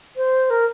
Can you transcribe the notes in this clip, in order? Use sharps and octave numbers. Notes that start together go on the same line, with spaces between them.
C5
A#4